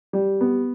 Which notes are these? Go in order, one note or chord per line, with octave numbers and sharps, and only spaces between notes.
G3
B3